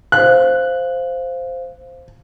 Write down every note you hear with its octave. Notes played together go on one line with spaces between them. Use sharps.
C5 F5 F#6